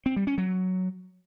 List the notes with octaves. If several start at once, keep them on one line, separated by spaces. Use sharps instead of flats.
C4
G3
C#4
F#3